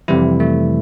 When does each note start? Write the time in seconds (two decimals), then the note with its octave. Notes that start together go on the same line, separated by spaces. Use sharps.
0.08 F2 C3 E3 G3 E4
0.40 A3